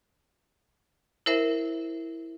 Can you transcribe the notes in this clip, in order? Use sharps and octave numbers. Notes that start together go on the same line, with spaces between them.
E4 A#4 C5 E5